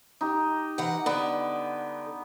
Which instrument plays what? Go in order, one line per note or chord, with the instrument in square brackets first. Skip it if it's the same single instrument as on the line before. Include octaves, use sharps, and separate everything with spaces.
[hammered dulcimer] D#4 G4
[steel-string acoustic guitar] E3 F#5
[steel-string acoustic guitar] D3 [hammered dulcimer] B3